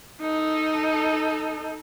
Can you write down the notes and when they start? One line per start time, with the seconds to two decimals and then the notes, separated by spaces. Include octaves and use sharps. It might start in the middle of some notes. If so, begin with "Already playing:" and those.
0.22 D#4 A4